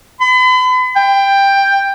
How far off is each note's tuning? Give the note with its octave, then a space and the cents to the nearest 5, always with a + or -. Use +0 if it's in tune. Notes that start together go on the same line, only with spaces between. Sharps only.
B5 +40
G5 +10